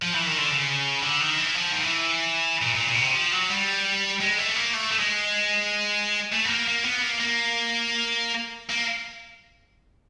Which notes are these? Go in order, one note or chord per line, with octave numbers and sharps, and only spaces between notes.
F3
E3
D#3
D3
C#3
D3
D#3
E3
F3
D#3
E3
A#2
A#2
A#2
B2
C3
F3
F#3
G3
G#3
A3
A3
A#3
A3
A3
G#3
A3
B3
A#3
A#3
B3
A#3
A#3
A#3